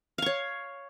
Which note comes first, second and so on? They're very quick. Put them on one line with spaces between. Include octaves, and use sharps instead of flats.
F5 C#6 C#5